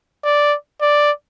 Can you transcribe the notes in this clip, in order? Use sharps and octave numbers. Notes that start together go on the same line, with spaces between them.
D5
D5